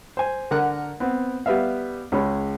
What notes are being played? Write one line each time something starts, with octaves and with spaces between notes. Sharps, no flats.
C5 G#5
D3 A#4 F#5
B3 C4
G3 B3 B4 E5 F5
C#2 G#3 C#4 B5